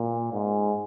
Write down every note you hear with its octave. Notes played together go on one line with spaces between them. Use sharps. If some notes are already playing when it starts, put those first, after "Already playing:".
Already playing: A#2
G#2